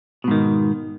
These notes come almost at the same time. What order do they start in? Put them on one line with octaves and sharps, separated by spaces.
B2 G#2 D#3